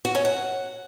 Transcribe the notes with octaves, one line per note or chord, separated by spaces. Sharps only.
F#4
C#4
F#5